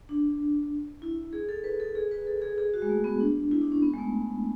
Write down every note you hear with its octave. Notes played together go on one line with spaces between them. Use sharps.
D4
E4
G#4
A4
B4
A4
G#4
B4
A4
G#4
G#4
F#4
G#3
A3
B3
D4
E4
D4
C#4
B3
G#3
A3